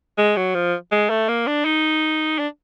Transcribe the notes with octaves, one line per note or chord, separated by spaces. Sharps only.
G#3
F#3
F3
G#3
A3
A#3
D4
D#4
D4